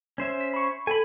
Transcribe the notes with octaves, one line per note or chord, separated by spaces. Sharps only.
C#4 C5 E5
B6
B5 C#6
A4 G#5 B5